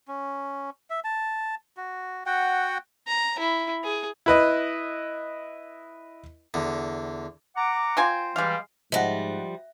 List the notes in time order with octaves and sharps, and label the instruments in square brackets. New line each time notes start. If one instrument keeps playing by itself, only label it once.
[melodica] C#4
E5
A5
F#4
F#4 F#5 G5
[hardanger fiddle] A#5
E4
G#4
[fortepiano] E4 B4 D#5
[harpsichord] E2 D3
[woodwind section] F#5 A#5 D6
[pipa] C4 F4 G#5
[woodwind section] E3 G3 [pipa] G#3 F5
[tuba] G#2 [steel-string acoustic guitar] F3 G3 [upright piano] D#5 F#5 [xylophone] E5 A#6